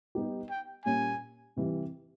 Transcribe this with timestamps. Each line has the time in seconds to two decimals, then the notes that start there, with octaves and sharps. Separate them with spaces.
0.15 G3 B3 D#4 G4
0.50 G5
0.85 A#2 G3 A#3 C#4 G#5
1.56 C3 E3 G3